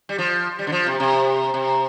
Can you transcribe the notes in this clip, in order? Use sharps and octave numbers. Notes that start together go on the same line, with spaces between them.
G3
F3
G3
D3
F3
C3
C3
C3